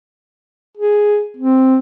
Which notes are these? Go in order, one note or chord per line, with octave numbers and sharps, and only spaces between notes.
G#4
C4